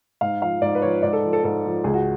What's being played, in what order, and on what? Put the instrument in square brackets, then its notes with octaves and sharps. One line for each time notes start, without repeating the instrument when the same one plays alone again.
[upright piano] G#2 F5
F3 F5
G#2 D5
B4
F3 C#5
G#2 D5
A4
F3
A4
G#2 A4
F3
C#2 G#4
F#4